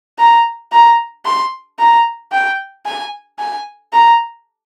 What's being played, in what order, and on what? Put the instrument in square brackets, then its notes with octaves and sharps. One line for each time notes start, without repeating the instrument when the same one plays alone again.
[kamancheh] A#5
A#5
C6
A#5
G5
G#5
G#5
A#5